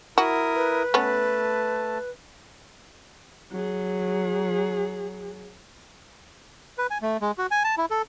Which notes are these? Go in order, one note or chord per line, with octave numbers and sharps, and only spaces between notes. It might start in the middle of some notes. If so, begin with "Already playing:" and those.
E4 F#4 A#4 D#6
B4
A3 B3 C#4 A5
F#3 G#4
B4
G#5
A3
G#3
F#4
G#5
A5
E4
A4